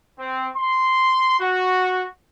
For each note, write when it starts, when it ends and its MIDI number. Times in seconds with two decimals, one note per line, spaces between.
0.19 0.48 60
0.56 1.38 84
1.39 2.05 66